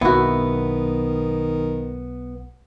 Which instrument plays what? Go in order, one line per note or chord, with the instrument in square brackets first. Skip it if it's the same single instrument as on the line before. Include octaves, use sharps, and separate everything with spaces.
[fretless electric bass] B1 E3 C4 [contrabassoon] D#3 [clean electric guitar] B3 [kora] E4 F#4